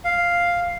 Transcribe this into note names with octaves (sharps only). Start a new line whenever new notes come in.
F5